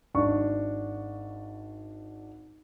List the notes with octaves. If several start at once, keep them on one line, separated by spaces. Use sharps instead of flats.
G#1 D4 C#6